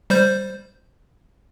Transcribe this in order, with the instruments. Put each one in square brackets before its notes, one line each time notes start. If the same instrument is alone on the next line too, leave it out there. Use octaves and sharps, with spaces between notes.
[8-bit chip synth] G3 C5 G6